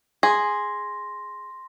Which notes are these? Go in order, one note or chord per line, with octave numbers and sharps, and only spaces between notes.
G#4 C6 A#6